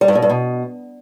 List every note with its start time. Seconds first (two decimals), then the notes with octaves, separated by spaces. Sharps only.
0.01 G3
0.08 G2
0.15 B2
0.22 G2
0.30 B2